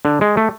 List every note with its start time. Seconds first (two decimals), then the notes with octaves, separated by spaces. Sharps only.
0.05 D3
0.21 G#3
0.37 A3